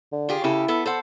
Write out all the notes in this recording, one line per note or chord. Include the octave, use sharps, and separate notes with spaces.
D3
F4 G4 G#4
C#3 E4 G4 A4
B3 A4
A4 C5 F#5